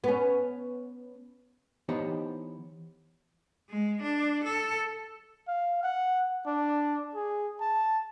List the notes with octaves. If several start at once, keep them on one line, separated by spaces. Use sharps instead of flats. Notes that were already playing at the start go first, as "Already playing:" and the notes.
B3 C#4
E3 B3 D#4 G4 C5 C#5
G#3
D4
A4
F5
F#5
D4
G#4
A5